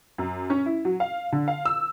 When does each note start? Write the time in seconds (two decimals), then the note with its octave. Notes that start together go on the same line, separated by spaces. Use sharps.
0.18 F#2
0.50 C#4
0.66 E4
0.85 F#3
1.00 F5
1.32 D3
1.48 F5
1.65 E6